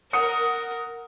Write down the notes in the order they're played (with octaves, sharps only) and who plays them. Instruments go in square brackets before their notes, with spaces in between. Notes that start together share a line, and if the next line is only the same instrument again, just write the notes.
[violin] A#4 [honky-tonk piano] F#5 D#6 C#7